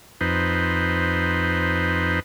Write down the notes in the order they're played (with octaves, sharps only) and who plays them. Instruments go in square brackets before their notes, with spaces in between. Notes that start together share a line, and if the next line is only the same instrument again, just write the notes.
[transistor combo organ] F2 D#4 B4 C5